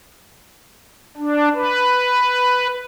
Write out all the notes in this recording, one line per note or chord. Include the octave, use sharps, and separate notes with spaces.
D4
B4